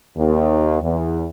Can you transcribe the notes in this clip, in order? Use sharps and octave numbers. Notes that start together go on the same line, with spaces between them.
D#2
E2